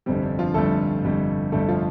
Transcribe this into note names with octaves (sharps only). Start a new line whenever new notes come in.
G1 F2 C3 G3 C4
D4
F3 F4
G1 F2 C3 G3 A3 A4
G1 F2 C3 G3
G1 F2 C3 G3 A3 A4
F3 F4